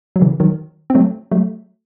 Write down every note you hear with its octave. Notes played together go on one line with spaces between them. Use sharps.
F#3
C#3 E3
D#3 F#3
C4
F#3 A3
F#3 A3